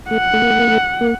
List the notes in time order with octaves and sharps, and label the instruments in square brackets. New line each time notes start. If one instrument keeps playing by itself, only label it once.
[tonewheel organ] A3 [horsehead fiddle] F#5
[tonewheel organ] A3
A#3
A3
A#3
A3
A#3